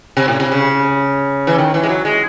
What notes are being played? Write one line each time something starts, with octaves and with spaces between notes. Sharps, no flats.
C3
A2
C3
C#3
E3
D#3
E3
G#3
F#3
G#3